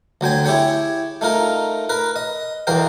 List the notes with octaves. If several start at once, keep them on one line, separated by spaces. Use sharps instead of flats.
D2 F#3 G5 G#5
E4 G4 G#4 C#5 G5
A3 D#4 F4 A#4
A#4 B4
D#5
B1 E2 B2 A#4 F5 G5